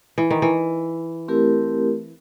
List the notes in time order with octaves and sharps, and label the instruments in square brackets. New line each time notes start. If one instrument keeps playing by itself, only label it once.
[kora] E3
D#3
E3
[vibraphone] A3 C4 E4 G4 A#4